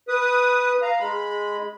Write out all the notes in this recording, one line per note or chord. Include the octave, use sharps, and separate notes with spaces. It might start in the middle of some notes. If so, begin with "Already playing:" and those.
B4 D#6
F5 A#5
G#3 B5